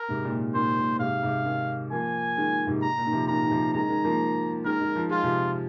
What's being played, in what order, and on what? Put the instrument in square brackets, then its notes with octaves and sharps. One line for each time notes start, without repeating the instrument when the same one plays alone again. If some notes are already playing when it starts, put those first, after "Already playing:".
Already playing: [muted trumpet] A#4
[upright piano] G#2 C3
A#2 D#3
[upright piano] A#2 D#3 [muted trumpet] C5
[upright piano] A#2
[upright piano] G#2 C3 [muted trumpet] F5
[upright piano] G#2 C3
D#3 G#3
[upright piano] F3 A#3 [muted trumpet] G#5
[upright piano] D#3 G#3
G#2 C3
[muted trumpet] A#5
[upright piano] A#2
D#3
C3 F3
[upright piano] A#2 D#3 [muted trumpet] A#5
[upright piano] D#3
C3 F3
[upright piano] D#3 G#3 [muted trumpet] A#5
[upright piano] D#3 G#3
F3 A#3
[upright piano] D#3 G#3 [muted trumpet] A#4
[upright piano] D#3 G#3
F3
[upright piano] G#3 [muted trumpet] F4
[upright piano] C3 F3